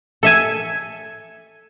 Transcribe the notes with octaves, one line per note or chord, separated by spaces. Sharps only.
A4 E5 G#5